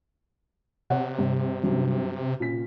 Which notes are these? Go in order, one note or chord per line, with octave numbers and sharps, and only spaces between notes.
C3 C#5 F#5
G2
G2 F#3 C#4
A#2 C#4 B6